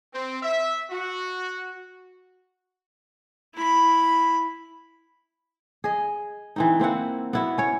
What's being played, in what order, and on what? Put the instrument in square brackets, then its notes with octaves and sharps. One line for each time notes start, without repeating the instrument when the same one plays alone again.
[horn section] C4
E5
F#4
[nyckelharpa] E4 B5
[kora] G#4 D#5
E3 C4 D#4
A#3 C4 E4 F#5
B3 E4 F#4
C#4 C#5